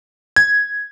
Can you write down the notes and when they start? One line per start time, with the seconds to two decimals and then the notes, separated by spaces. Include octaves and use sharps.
0.36 G#6